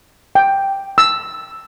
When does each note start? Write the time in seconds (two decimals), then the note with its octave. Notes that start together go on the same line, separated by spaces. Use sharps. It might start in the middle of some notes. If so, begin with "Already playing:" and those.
0.35 G5
0.98 E6